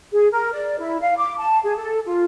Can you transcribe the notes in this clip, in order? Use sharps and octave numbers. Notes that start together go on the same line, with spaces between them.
G#4
A#4
D5
E4
F5
D6
A5
G#4
A4
F4